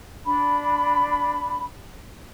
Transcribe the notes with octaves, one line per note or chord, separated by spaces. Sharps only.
D4 B5